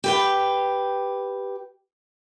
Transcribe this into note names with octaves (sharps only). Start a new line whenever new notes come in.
G4 B4 G5